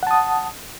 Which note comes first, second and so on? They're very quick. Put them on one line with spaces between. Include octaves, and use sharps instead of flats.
F#5 A5 D#6